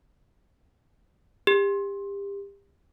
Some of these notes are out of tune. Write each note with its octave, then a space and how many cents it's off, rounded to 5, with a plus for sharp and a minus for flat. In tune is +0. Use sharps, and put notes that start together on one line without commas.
G4 +30